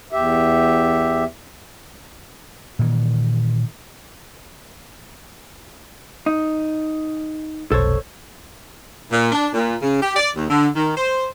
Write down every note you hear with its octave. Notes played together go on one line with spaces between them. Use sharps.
E2 G4 E5
A#2 D#3 E3
D#4
F1 B1 A4 C5 C#5
A#2
D4
A#2
C#3
G4
D5
D#2
D3
D#3
C5